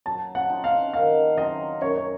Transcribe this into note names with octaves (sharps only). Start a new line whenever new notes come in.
F#3 A5
F#5
C4 D#4 F#4
F5
D#3 F5
F#3 C4 D#5
F#2 C#5
C#5